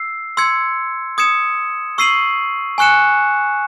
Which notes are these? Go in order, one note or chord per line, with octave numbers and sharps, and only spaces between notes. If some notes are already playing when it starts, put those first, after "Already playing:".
Already playing: E6 C7
C6 E6 G#6 C#7
D#6 G#6 C#7 E7
C#6 E6 C7 D#7 F#7
G#5 C#6 F#6 C#7 E7